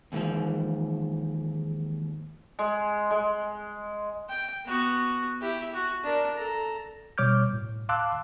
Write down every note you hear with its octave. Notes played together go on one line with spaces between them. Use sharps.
D#2 G#2 C3 E3 F3
G#3
G#3
G5
B3 F#4
E4 G4
F#4
D4 A#4
A4 A#5
B2 G3 C#5 D6 F6 G6
A2
F5 A5 C6 D6 E6 F#6